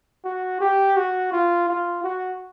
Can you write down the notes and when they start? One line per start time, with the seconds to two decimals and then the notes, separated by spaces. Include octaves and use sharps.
0.25 F#4
0.61 G4
0.96 F#4
1.32 F4
1.68 F4
2.04 F#4